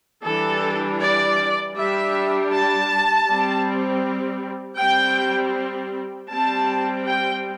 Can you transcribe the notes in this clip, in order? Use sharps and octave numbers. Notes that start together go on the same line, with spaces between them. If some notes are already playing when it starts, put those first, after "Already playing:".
E3 G3 D4 A4
D5
G3 D4 E5
A5
G3 C4
G3 C4 G5
G3 C4 A5
G5